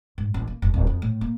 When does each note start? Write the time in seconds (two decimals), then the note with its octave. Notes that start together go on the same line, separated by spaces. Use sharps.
0.18 G#2
0.34 A1
0.47 A#3
0.62 F#1
0.74 D1
0.87 F2
1.02 A2
1.21 A#3